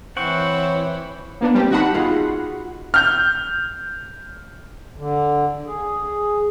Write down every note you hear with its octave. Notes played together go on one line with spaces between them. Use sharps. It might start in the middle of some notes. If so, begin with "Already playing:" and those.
E3 C4 E4 C#5 F#5 C#6
A#3 B3 D4
G3 C4 G4
D#2 D#4 F#4 F#5 A5 B5
D#4 F4 G#4
F6 G6
D3
G#4